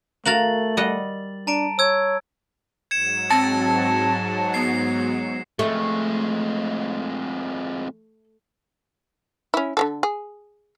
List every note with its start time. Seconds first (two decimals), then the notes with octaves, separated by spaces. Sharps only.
0.26 A3 F#4 A#4 F5 A6 F#7
0.77 G3 D#5 F#5
1.47 D4 A5 A#5 D7
1.79 C#5 E6 G#6
2.91 G#2 F#3 G#6 C#7 E7
3.30 C4 A5 A#6 C#7
4.54 B3 C7
5.59 F2 G#3 A3
9.54 C#4 E4
9.77 D3 F#3 A4
10.03 G#4